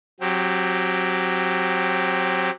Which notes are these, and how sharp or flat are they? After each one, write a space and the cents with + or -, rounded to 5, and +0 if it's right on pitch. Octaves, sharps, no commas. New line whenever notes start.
F#3 -5 C4 +25 G4 -10